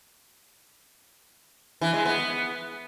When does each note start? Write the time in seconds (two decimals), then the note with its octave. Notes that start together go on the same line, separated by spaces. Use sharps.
1.81 E3
1.93 G#3
2.05 B3